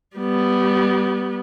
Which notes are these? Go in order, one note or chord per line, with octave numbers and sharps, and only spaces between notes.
G3 B3